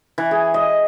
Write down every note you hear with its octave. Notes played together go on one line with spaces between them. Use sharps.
E3
G#4
D#5